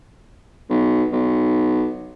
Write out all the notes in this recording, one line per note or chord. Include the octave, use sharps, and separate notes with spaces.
B1
B1